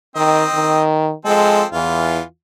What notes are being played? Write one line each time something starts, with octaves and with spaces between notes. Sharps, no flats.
D#3 C4 D#5
D#3
F3 G#3 C4 A4
E2 E3 F4